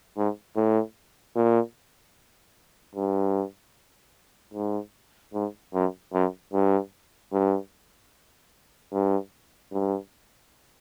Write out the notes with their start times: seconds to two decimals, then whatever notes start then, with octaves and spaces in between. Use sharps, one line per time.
0.17 G#2
0.56 A2
1.36 A#2
2.95 G2
4.54 G#2
5.34 G#2
5.74 F#2
6.14 F#2
6.53 G2
7.33 G2
8.93 G2
9.72 G2